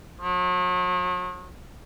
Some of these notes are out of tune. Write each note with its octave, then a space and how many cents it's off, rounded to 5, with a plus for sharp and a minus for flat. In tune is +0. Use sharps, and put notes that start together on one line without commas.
F#3 -40